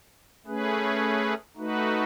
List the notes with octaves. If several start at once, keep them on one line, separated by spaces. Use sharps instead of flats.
A3 C#4 G#4 B4
A3 D#4 F#4 B4